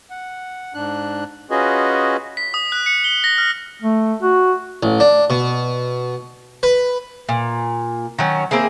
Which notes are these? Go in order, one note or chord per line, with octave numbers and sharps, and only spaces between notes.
F#5
G#2 D4 F#6
C#4 F4 F#4 G#4 B4 D#5
B6
D#6
F#6
C#7
G7
A#6
F6
A3
F#4
A1
D4
B2
B4
A#2
D#3 F#3 C#4
A#3 C4 E4 G#4